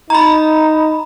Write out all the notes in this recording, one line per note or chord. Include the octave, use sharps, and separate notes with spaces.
D#4 A#5 B5